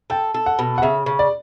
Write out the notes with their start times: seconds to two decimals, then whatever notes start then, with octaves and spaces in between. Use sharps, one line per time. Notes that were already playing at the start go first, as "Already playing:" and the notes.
0.10 A4 G5
0.34 A4
0.46 F#5
0.59 B2
0.78 F#5
0.82 C#3 E5
1.06 C#3
1.19 D5